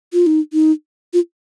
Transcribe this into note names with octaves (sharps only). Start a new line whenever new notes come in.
F4
D#4
D#4
F4